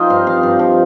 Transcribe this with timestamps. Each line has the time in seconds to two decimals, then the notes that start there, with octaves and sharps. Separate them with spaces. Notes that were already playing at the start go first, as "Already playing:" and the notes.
Already playing: F3 C4 D#4 F4 D#5
0.10 G2 F5
0.27 F3 F5
0.43 G2
0.59 F3